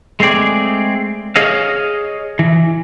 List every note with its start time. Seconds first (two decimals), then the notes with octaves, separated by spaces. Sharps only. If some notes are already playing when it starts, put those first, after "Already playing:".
0.20 G#3 A3 C4 G#4 D5
1.36 G#4 C#5 D#5 F5
2.39 E3